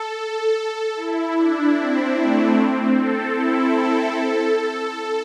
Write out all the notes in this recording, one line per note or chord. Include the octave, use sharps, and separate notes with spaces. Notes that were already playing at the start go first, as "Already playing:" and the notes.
Already playing: A4
E4
D4
C4
A3
C4
A4
E4
A4
A4